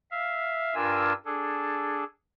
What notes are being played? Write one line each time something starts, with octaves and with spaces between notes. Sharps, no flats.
E5 F5
G2 D4 F4 A#4 G#5 E6
D4 G#4 A4